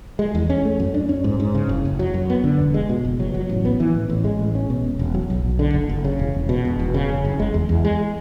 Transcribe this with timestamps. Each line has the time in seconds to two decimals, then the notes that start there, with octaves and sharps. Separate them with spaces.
0.19 G#3
0.35 E2
0.50 C#4
0.65 A3
0.79 F#2
0.94 D4
1.09 C#4
1.24 G#2
1.40 G#2
1.55 C#3
1.69 F#1
1.85 F#1
1.99 F#3
2.14 F#2
2.30 B3
2.44 D3
2.59 E1
2.74 G#3
2.89 B2
3.04 F#1
3.20 F#3
3.34 F#3
3.49 A1
3.65 B3
3.80 E3
3.94 A1
4.09 A1
4.25 G#3
4.39 A1
4.55 C#4
4.70 B2
4.84 E1
4.99 E1
5.14 F#3
5.30 B1
5.45 B1
5.59 D3
5.74 F#1
5.89 F#1
6.04 C#3
6.19 E1
6.34 E1
6.49 B2
6.65 E1
6.79 E1
6.94 C#3
7.09 F#1
7.24 F#1
7.39 G#3
7.54 E2
7.69 E2
7.85 G#3